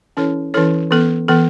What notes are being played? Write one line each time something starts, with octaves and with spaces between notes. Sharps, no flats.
E3 C#4 E4 A4 C#5
E3 C#4 E4 A4 C#5
E3 B3 A4
E3 B3 A4